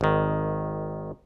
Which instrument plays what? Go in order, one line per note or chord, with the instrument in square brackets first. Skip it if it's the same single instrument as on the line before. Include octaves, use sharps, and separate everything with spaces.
[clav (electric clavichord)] G#1 D#3